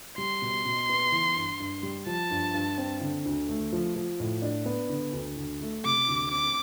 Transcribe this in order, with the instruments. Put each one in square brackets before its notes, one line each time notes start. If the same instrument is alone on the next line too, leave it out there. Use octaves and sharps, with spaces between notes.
[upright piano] G3 [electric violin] C6
[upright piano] B2
B2
B3
E3
G2
G2
G3
[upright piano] F3 [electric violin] A5
[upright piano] G2
G2
C4
D3
D2
A3
F3
F3
A2
D4
B3
D3
D2
D2
A3
[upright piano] C3 [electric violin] D6
[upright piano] D2
[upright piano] C4 [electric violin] D6